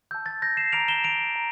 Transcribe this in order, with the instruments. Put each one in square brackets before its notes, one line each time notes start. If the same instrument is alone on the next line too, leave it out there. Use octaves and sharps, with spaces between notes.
[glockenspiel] A5 E6 G6
A6
G6 A#6
C7 E7
A#5 D6 F6 D7 F7
E7 G7
D7 F7
A#5